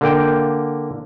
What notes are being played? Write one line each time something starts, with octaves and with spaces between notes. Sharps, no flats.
D3 A#3 G5